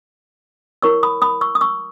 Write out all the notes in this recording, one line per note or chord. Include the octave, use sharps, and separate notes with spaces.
E4 A#4 C#5 C#6 E6
B5 D#6
B5 D#6
C#6 E6
D#6
C#6 E6